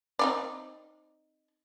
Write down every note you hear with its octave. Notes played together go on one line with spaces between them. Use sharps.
C4 D#4 D5